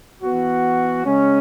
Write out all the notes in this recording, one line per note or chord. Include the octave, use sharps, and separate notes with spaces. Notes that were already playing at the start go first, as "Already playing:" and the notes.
E3 B3 F#4
C#3 G#3 C#4